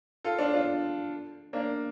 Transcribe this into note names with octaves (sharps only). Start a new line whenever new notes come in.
F4 A4
D4 F4
D4 F4
A#3 D4